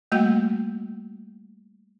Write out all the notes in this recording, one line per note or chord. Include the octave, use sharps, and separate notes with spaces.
G3 A3 A#3 F#4 F#5 G5